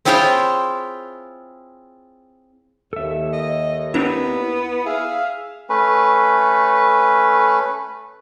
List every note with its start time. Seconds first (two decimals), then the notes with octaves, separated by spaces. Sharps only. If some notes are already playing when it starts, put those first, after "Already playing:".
0.05 C4 E4 F4 G#4 C#5 G5
2.93 D#2 A4 E5
3.33 D#5
3.94 B3 C4 D4 E4 A#5
4.86 G#4 E5 F5
5.70 A3 C#4 B4